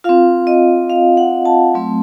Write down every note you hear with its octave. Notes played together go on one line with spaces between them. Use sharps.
C4 F4 F5
D#5
F5
F#5
A5
F#3 A3 C4